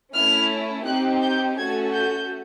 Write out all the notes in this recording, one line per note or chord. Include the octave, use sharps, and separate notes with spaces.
A3 C#4 E4 F6
C4 D#4 G4 F#6
G6
A3 C#4 F#4 A4 G#6
G6